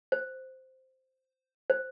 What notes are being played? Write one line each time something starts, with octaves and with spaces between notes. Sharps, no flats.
C5
C5